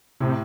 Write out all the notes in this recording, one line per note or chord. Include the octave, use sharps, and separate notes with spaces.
A2 C3